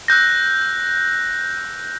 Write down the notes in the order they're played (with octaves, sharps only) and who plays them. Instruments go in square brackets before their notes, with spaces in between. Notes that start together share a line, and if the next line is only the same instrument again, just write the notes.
[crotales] E6 F#6 G6 A#6